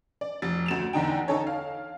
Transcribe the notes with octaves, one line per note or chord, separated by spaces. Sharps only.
D5
F1 A6
D2 E7 F7
E2 D3 D#4 G5
D#4 A4 C#5
F5